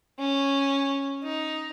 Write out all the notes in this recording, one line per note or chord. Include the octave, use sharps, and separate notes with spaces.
C#4
D#4